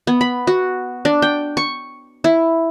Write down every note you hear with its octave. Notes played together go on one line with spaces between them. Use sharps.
B3
B5
F#4
D4
G5
C#6
E4